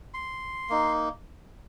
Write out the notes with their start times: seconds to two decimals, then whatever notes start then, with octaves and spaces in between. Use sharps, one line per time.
0.14 C6
0.69 A#3 D#4